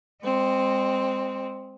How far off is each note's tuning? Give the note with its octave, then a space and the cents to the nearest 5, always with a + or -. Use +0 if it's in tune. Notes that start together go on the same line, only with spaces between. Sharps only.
G#3 -30 C4 +0